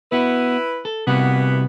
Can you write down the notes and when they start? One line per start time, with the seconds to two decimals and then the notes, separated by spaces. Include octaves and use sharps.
0.12 B3 E4 F#4 B4
0.85 A4
1.07 C3 E3 G3 A#3 B3 F#4